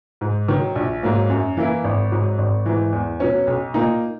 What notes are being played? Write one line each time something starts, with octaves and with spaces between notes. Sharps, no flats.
G#2
D#3 F#3
A#1
G#2 F#3 A#3
F#2
E3 A#3 E4
G#1
G#2 F#3
G#1
G#2 E3
E2
B2 F#3 C#4
B1
A#2 A#3 D#4